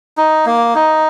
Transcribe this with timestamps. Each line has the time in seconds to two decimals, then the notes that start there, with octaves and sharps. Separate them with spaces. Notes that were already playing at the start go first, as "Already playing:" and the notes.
0.18 D#4
0.46 A#3
0.75 D#4